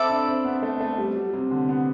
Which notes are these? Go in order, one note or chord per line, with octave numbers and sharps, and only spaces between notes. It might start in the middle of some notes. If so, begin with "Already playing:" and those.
Already playing: C4 A4 E5 B5 D6
D4
C4
B3
A3
A3
G3
F#3
C3
D3
B3